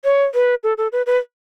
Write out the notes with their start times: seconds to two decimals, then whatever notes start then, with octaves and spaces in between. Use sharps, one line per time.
0.04 C#5
0.34 B4
0.63 A4
0.77 A4
0.92 B4
1.06 B4